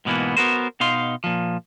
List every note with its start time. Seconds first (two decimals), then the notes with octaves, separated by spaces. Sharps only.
0.05 G#2 B2 E3 A#3 B3
0.37 B3 F#4 A#4 C5
0.80 B2 D#4 F5 C6
1.24 A#2 F3